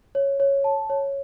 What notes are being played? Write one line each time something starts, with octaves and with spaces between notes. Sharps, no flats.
C#5
C#5
A5
C#5